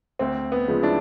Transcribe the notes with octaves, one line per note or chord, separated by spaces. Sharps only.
D2 C4
B3
C#3 F3 G#3
D4 E4